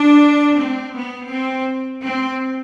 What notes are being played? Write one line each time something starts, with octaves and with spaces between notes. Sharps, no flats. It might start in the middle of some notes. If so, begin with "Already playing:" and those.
Already playing: D4
C4
B3
C4
C4